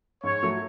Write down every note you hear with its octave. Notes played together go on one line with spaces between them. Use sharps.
G#2 C#5
F#3 A3